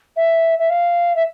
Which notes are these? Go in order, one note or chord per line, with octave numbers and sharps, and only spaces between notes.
E5
E5
F5
E5